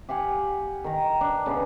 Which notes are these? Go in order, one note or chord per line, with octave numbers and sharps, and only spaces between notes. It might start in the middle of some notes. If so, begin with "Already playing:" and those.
G4 F5 F#5 G#5
D#3 A#5
D4
C#3 B3